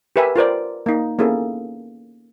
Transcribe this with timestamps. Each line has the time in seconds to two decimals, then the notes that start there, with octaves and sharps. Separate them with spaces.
0.16 G4 A#4 B4 E5 G#5
0.36 F4 A#4 C5 D5
0.86 A#3 D#4
1.19 A#3 B3 C#4 E4 G#4 A4